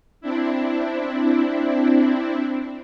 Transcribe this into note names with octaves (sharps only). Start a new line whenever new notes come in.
C4 D4 E4